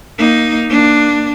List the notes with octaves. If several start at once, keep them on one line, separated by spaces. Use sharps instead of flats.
A#3 D#4
A#3 D4